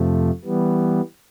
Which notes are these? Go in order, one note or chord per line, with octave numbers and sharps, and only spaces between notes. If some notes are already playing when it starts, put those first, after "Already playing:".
Already playing: F2 C3 F3 A3
E3 G3 B3